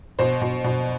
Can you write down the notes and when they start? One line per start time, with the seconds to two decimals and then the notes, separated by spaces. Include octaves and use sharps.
0.19 B2 C5
0.41 B2
0.64 B2